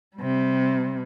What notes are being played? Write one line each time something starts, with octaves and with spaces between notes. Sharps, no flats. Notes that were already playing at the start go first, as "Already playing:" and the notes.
C3 G3